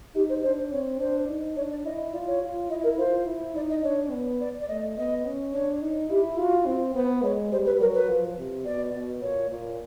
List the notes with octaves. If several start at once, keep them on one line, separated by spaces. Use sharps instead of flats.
D#4 G4
C5
D4 C5
C4 C#5
D4 C5
D#4
D4 C#5
D5
E4 D#5
F4 D5
C#5
F4
E4 D#5
A#4
F4 C5
E4
D#4 D5
D#5
D4 C#5
B3
D5
D5
A3 D#5
B3 D#5
C#4
D4 C#5
D#4
E4 G4
F4 F#4
C4
B3 C5
G#3 C#5
G3 C5
B4
F#3 A#4
B4
F3
C3
B2 D5
B2
A#2 C#5
A#2